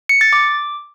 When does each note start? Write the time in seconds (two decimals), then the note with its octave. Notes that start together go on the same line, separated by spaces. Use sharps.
0.09 C#7
0.21 A6
0.33 D6